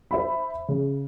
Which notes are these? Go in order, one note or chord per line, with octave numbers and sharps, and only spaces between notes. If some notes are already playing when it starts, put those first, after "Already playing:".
C5 E5 B5
C#3